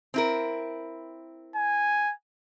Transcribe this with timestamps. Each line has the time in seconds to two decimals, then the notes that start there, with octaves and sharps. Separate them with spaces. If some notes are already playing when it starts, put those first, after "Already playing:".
0.14 C4 E4 A#4
1.56 G#5